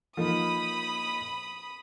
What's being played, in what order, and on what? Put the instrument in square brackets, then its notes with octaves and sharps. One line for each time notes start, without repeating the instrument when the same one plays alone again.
[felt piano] F3 A#3 D#4 [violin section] B5 D#6